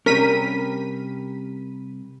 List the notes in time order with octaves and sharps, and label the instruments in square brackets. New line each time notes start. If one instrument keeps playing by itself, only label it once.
[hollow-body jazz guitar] C3 G3 C#4 [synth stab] A#4 B6 D#7